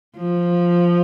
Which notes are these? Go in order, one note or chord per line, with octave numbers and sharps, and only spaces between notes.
F3